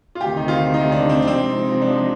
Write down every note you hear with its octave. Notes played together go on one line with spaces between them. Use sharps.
F4
D2 C3 D#3 G4
D#4
F4
D#4
D4
C4
D4
C3 F3 G#3 C4 D#4
D4